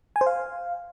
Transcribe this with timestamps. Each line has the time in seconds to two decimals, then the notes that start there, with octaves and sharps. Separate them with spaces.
0.16 G#5
0.21 C5
0.26 F5